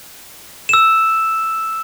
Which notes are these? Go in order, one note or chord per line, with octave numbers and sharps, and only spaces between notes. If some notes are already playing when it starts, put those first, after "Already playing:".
E6 E7